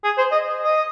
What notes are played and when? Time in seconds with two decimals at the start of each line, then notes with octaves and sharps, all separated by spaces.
0.04 G#4
0.18 C5
0.32 D#5
0.64 D#5